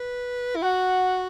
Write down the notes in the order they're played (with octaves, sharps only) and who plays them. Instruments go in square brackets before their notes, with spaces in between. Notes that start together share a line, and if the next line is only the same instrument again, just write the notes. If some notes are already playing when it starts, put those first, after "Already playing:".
Already playing: [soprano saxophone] B4
E4
[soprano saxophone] F#4 [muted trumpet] F#5